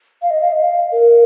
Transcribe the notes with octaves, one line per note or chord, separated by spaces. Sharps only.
F5
D#5
F5
D#5
F5
A#4